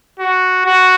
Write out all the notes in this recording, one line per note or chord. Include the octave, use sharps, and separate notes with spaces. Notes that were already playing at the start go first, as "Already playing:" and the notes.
F#4
F#4